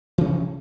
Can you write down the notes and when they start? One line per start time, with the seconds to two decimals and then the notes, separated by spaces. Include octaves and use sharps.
0.18 E3
0.21 C3
0.24 C#4